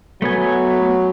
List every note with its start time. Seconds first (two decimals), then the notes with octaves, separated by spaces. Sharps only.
0.22 F#3 A3 B3 G#5